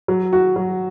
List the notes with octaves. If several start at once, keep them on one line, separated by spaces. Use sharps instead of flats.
F#3
F#4
F#3